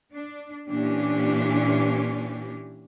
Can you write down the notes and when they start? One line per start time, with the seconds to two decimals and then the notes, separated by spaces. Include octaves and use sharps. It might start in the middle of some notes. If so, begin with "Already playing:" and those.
0.14 D4
0.68 A#2 E3 C#4 D4 G4